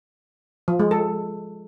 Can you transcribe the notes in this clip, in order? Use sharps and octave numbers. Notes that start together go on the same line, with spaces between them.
F3
G#3
A4